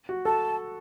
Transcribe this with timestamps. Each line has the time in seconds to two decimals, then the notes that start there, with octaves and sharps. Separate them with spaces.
0.09 F#4
0.25 A4 A5